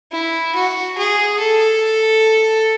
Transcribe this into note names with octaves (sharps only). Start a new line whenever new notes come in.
E4
F#4
G#4
A4